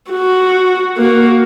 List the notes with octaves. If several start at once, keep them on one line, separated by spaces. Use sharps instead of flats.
F#4
A#3 F#4